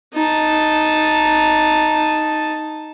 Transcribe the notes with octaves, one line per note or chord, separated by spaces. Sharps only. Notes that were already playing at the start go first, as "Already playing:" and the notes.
D#4 A5